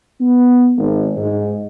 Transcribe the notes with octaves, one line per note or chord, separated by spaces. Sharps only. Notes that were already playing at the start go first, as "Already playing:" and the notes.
B3
G#1
G#2